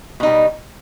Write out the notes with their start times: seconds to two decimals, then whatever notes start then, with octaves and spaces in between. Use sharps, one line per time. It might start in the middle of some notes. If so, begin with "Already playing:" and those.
0.20 B2
0.23 D#4
0.26 G3